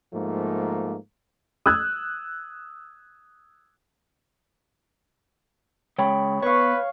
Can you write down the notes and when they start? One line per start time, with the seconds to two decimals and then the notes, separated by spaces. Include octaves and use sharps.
0.14 G#2 F3 A3 A#3
1.66 D#6 E6 F#6 G#6
5.98 C#3 G#3 C#5 G5 B5 C#6
6.42 B3 B4 C#5 F5 C#6